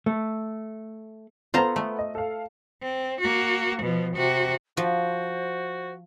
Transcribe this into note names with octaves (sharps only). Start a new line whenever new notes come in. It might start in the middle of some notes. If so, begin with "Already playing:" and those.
A3
B3 F4 A4 C5 A#5
A3
D#5
A4 F5
C4
A#3 F#4
B2 F3
C3 F#4
F3 F#4 C5